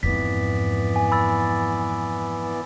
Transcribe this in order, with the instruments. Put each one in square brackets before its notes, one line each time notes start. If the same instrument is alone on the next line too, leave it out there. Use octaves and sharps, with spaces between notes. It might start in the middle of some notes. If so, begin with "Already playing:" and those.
[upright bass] F2 G#2 [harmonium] E3 B3 D5 [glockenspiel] B6
[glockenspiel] G#5
B5 E6 A6